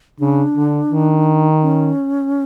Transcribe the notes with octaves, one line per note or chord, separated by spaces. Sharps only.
C#3 D4
D3
D#3
C#4